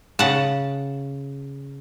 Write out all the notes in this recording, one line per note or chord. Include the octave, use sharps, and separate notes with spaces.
C#3 F#5 A5